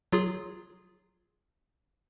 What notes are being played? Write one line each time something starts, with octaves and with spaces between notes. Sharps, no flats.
F#3 F4 G#4